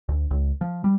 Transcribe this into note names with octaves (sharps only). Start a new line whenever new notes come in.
D2
C#2
F3
G3